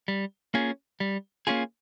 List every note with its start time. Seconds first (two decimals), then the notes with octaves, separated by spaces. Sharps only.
0.08 G3
0.54 A#3 C#4 F4 G#4
1.00 G3
1.47 A#3 C#4 F4 G#4